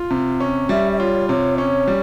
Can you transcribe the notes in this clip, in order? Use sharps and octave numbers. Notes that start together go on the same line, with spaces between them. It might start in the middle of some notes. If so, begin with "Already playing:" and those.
Already playing: F4
C3
C#4
G3 E5
E5
F4 C#5
C3 C#5
C#4 C#5
G3